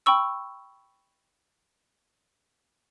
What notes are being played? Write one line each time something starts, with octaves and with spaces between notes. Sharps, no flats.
G5 B5 C#6 E6